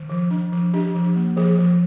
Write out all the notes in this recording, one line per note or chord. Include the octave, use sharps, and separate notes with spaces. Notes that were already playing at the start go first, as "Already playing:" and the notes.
Already playing: D#3
F3
D4
F3
D4 G4
F3
A#3
F3 G#4
F3